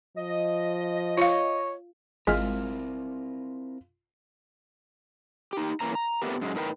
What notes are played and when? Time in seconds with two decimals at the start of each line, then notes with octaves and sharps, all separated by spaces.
0.16 F3 D#5
1.18 F4 C#5 F5
2.27 G#1 G#3 C4 E4 F4 A#4 F6 B6
5.53 D#4 G4
5.81 E3 A#3 C#4 A#5
5.95 A#5
6.22 A3 B3 C4 D4 G4 A#4
6.41 F#2 G#3
6.55 A2 D#4 A#4 B4 F#5 G5